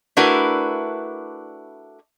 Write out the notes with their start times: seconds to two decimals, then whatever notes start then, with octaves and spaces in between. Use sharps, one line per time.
0.17 A3 D4 E4 F#4 A#4 B4